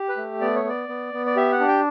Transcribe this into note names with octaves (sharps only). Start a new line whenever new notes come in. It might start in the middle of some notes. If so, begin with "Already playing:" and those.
Already playing: G4
B4
A3
B3 D5
C#5
B3 D5
B3
B3
D5
G4 E5
F#5
D4
G5